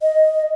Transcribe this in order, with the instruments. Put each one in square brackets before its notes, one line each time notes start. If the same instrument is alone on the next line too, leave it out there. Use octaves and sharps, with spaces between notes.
[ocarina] D#5